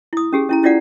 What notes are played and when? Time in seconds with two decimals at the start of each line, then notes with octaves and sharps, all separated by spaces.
0.13 E4 D#6
0.33 C#4 G4 G#4
0.49 C#4 E4 A#5
0.63 C#4 E4 F4 D5 F#5